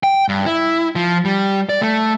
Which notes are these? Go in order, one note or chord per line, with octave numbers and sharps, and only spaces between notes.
G5
G2
E4
F3
G3
D5
A3